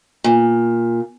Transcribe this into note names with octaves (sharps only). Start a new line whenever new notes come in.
A#2